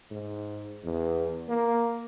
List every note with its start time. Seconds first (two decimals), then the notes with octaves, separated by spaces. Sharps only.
0.11 G#2
0.84 E2
1.49 A#3